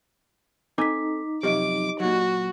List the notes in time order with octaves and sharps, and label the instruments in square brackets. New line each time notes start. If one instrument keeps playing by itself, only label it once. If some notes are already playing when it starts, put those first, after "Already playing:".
[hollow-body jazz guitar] C4 A4 G#5 [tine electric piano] D#4 [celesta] D6 B6
[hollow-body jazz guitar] F#2 C3 F3 [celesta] G4 D#5 D7 [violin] D6
[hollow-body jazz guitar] A#2 F#3 [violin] F#4